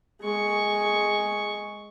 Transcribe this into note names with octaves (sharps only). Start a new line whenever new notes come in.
G#3 C#6